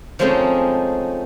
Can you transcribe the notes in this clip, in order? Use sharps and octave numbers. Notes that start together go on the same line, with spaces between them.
F3 G#3 A3 C4 C#4 D#4